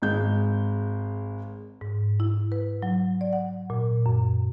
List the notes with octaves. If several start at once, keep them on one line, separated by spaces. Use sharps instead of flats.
G#1 G#3 G6
G#2
E4
B4
F#3
D5
F#5
A#2
F#2